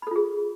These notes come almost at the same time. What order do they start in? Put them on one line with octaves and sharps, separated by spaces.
B5 A4 F4 G#4